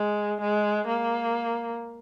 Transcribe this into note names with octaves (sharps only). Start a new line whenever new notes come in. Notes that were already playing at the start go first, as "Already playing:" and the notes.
Already playing: G#3
G#3
A#3